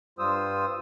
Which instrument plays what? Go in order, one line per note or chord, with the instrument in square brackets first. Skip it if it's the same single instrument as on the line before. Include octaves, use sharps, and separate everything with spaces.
[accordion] G2 G3 F4 C5 D#6 E6